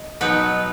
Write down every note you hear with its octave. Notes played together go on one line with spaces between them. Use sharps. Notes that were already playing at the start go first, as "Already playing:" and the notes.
Already playing: D#5
B2 F#3 B3 D#4 B4